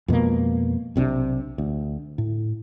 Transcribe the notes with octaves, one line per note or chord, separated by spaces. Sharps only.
F2 B2 G#3 A#3
B1 C3 C4 D4
D2
A2